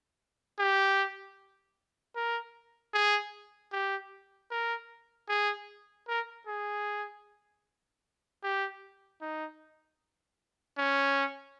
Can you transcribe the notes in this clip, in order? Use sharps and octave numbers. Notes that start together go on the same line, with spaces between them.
G4
A#4
G#4
G4
A#4
G#4
A#4
G#4
G4
D#4
C#4